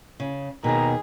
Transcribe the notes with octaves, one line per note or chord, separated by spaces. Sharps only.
C#3
D#2 B2 D#3 G#4 A#5